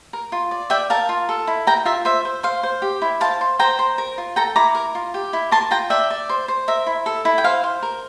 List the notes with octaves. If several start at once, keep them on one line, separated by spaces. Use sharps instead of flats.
A#4
F4
D5
D5 E5 G5
A#4 F5 A5
F4
A4
E4
A#4 G5 A#5
F4 E5
C5 E5
C5
C5 F5
C5
G4
E4
C5 F5 A5
C5
C5 G5 A#5
C5
A#4
F4
A4 G5 A#5
E4 A#5 D6
A#4
F4
G4
E4
A#4 A5 C6
F4 G5 A#5
D5 E5 G5
D5
C5
C5
A#4 E5
E4
A4
E4
G5
C5 F5
C5
A#4